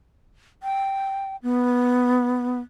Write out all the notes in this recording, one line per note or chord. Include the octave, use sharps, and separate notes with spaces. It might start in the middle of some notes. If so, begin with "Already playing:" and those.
G5
B3